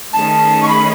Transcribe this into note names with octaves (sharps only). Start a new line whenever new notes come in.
D#3 A3 C#4 G#4 A5
C#6
B5